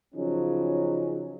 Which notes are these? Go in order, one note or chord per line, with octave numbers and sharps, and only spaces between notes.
C#3 F3 F#3 C#4 D#4